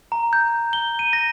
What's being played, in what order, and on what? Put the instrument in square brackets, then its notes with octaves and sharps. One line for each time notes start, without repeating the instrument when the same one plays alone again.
[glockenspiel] A#5
G6
G7
D#7
A#6